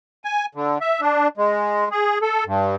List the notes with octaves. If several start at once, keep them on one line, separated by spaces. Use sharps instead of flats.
G#5
D3
E5
D4
G#3
G#4
A4
G2